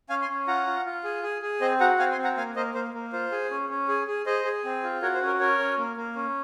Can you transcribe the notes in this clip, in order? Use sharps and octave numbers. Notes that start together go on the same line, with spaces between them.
C#4 F5 G#5
G#5 C6
C#4
F4 F#5 A#5
F4
F4
G#4
G#4
G#4
C4 C5 D#5
F#4 F#5 A#5
C4 F5 G#5
G#5 C6
C4
F#5 A#5
A#3 F5 G#5
A#3 C5 D#5
A#3 C5
A#3
F4 C5
G#4
C#4
C#4
G#4
G#4
G#4 C5 D#5
G#4
C4
F4
F#4 A#4 C#5
C5
C#4
A#4
C#4 A#4 C#5
C#4
A#3
A#3
C#4